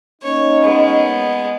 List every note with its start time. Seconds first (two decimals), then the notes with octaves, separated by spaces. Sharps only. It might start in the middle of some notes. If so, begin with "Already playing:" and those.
0.22 A#3 C#4 D#4 C#5
0.62 G#3 B3